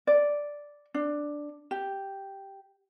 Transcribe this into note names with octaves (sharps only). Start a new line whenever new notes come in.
D5
D4
G4